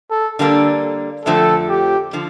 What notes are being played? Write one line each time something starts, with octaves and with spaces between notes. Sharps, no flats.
A4
D3 G3 A#3 D4 A4
F2 D3 F3 A3 C4 A4
G4
D3 F3